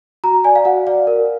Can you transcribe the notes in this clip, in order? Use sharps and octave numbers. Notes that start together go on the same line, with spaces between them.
F#4 A#5
D5 G#5
F5
F#4 F#5
D5 F5
A#4